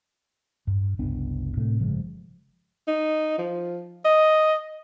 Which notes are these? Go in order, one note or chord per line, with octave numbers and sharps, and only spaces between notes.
G2
F#1 C2 B3 D4
A2 C3 A3
G1 C#3 F3 G#3
D#4
F3
D#5